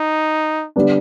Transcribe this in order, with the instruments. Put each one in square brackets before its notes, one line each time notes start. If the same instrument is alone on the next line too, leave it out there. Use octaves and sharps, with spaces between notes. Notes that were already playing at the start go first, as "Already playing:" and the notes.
Already playing: [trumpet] D#4
[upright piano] D3 G3 B3 D4